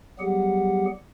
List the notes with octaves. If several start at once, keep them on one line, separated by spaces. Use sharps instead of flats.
F#3 G3 B3 G4 G#4 F#5